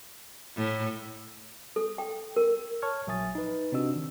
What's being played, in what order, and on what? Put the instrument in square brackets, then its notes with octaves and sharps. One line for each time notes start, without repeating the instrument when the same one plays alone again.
[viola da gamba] A2
[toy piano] A4
G5
A#4
[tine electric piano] C#5 A5 C#6 F6 G#6
A#1 F#3 E5 G#5 D#6 A6
D#4 B4
C3 C4 D4 F#4 D#5 E6
D#3